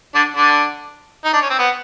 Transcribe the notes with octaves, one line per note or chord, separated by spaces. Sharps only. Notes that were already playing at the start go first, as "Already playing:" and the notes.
D3 D4
D3 D4
D#4
D4
C#4
C4
B3